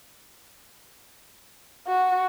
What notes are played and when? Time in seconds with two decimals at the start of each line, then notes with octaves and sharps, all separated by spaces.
1.87 F#4